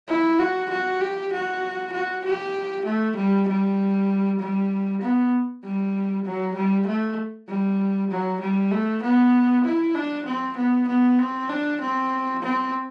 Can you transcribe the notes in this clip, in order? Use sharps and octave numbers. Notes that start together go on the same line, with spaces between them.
E4
F#4
F#4
G4
F#4
F#4
G4
A3
G3
G3
G3
B3
G3
F#3
G3
A3
G3
F#3
G3
A3
B3
E4
D4
C4
B3
B3
C4
D4
C4
C4